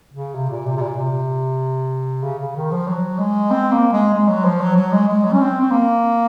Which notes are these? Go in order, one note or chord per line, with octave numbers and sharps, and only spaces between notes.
C#3
C3
A#2
C3
C3
A#2
C3
C#3
C#3
D#3
F3
F#3
G#3
C4
A#3
G#3
G#3
F#3
F3
F#3
F#3
G#3
G#3
F#3
C#4
C4
C4
A#3